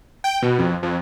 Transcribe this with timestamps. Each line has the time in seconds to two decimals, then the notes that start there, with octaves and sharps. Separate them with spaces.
0.24 G5
0.42 B2
0.59 F2
0.83 F2